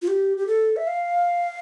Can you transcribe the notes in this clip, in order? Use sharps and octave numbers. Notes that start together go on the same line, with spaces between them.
F4
G4
G4
A4
E5
F5